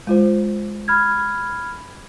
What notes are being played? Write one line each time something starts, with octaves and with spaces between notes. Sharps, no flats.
G#3 F4 C5
B5 F6 G#6